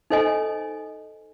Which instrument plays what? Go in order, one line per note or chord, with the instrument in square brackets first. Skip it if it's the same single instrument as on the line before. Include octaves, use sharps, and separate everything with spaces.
[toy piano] D#4 A4 C5 D#5 G#5 D#6